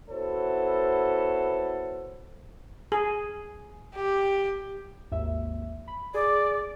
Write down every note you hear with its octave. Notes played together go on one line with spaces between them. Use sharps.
B3 E4 F#4 A4 C5 C#5
G#4
G4
G#1 D#2 E5
B5
G#4 D5